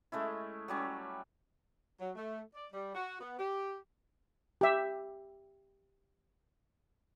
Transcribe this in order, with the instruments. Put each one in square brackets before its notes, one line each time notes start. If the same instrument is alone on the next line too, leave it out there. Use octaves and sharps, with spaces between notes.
[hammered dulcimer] G#3 A3 C#4 E4
F#3 G3 C#4
[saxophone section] F#3
A3
D5
G3
F#4
B3
G4
[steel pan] G4 E5